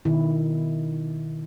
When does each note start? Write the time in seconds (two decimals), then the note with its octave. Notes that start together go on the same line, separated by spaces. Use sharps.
0.05 B2 D#3 E4